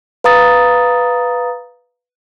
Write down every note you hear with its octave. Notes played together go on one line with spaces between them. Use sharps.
B4 F5 A#5 D#6 A6